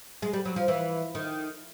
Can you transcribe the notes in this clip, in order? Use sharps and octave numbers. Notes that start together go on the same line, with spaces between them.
G#3
G3
F#3
F3
E3
D#3